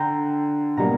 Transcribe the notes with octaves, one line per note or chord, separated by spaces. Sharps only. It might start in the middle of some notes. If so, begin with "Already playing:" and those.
Already playing: D3 G5 A#5
B2 G3 A#3 A#5